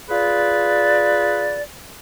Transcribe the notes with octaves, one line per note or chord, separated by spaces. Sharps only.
F4 G#4 B4 D5